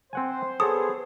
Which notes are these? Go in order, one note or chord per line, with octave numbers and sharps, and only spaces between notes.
C4 C5 F#5 G#5
B3 G#4 A4 C#5 D#6